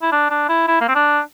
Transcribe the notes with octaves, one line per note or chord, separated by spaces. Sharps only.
E4
D4
D4
E4
E4
A#3
C4
D4